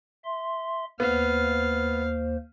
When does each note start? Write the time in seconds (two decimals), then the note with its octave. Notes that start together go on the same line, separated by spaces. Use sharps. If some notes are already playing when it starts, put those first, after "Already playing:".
0.25 E5 C6
1.00 D#2 A#3 B3 C5 F5